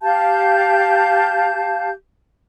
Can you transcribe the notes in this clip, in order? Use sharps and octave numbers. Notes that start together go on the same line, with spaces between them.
G4 F5 A5 G6